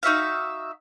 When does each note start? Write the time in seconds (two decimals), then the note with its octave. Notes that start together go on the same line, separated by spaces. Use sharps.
0.03 D#4 F#4 E5 F5